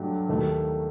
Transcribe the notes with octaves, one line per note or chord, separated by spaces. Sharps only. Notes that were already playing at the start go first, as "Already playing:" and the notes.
Already playing: G2 F#3 A3 G4
D#2 D#3 A3